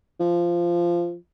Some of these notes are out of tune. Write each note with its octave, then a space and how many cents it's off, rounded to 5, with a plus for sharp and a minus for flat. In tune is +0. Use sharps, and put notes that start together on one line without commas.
F3 -15